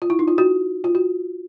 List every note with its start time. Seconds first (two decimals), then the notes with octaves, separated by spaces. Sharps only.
0.02 F4
0.10 E4
0.19 D#4
0.28 F4
0.38 F#4
0.84 F4
0.95 F#4